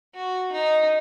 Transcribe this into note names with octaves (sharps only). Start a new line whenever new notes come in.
F#4
D#4